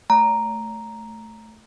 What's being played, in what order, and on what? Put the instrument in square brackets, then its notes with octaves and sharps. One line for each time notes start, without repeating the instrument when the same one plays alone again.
[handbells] A3 A#5